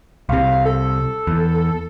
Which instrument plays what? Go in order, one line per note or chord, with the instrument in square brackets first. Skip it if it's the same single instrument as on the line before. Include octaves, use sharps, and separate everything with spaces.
[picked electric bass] C2 C3 [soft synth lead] F5
[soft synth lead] A4
[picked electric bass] E2